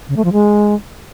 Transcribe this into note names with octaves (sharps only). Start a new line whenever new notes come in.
C#3
A3
F3
G#3